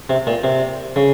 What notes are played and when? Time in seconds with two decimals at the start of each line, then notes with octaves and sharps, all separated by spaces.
0.10 C3
0.27 A#2
0.44 C3
0.96 C#3